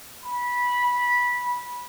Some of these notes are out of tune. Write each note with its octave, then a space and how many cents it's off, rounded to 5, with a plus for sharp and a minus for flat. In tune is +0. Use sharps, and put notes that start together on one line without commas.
B5 -15